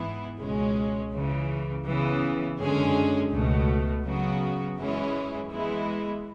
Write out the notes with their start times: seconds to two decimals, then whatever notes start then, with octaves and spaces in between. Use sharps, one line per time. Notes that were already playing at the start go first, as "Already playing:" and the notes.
Already playing: G#2 E3 B3 E4
0.40 C#2 B2 G#3 C#4
1.13 C#2 C#3 E3
1.86 C#3 E3 B3
2.58 F#2 D3 G#3 C#4 G#4
3.31 C#2 B2 A3
4.05 C#3 F#3 B3 F#4
4.77 F#2 E3 G#3 C#4 E4
5.51 E3 G#3 B3 E4